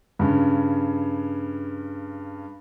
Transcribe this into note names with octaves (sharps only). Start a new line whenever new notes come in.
G2 C#3